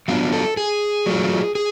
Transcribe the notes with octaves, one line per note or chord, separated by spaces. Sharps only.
F#3 B3 D4 F4 F5
A4
G#4
F#3 A3 F4
G#4